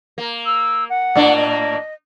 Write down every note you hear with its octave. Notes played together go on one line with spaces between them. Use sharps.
A#3
E6
F#5
A2 A#3 D4
D#5